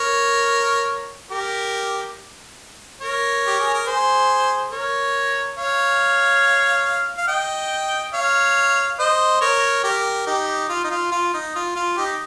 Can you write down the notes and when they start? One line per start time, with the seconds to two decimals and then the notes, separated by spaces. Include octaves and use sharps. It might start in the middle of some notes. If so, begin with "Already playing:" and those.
Already playing: A#4 C#5
1.31 G4 A#4
3.01 A#4 C#5
3.47 G4
3.60 G#4
3.74 A#4
3.87 G#4 C5
4.71 A#4 C#5
5.57 C#5 F5
7.18 F5
7.28 D#5 G5
8.13 C#5 F5
8.99 C5 D#5
9.41 A#4 C#5
9.84 G4 A#4
10.27 D#4 G4
10.69 F4
10.84 D#4
10.90 F4
11.12 F4
11.34 D#4
11.56 F4
11.76 F4
11.97 D#4 G4